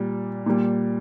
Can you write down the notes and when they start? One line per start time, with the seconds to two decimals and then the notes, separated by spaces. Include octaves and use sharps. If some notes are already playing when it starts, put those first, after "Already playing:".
Already playing: A#2 G3
0.46 A#2 G3